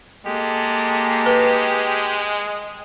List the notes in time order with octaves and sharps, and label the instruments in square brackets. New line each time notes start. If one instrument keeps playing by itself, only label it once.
[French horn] G#3 [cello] A#3 A4 [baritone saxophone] G4
[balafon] B4